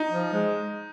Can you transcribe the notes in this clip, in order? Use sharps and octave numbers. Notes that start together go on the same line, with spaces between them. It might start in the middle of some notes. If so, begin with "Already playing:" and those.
Already playing: D#4
F3
G#3